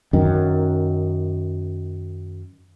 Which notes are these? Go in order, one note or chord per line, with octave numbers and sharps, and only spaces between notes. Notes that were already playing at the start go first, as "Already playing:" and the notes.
F#2 D#3